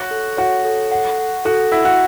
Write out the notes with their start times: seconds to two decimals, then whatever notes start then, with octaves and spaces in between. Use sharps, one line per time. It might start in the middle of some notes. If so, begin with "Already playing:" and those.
Already playing: F#4 C#5
0.11 A4
0.37 F#4 C#5
0.65 A4
0.91 F#5
1.18 F#5
1.45 F#4 A4
1.72 E4 F#5
1.85 F#4